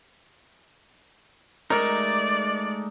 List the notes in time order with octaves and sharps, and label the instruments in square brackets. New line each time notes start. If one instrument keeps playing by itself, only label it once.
[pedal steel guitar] G#3 A3 D#4 [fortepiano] A#4 [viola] D5